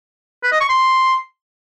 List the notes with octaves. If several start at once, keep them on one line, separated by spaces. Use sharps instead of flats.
B4
D#5
C#6
C6